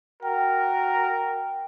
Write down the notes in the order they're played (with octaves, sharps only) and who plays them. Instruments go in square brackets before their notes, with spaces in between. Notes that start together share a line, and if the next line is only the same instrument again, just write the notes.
[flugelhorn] F#4 [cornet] A#4 [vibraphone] G5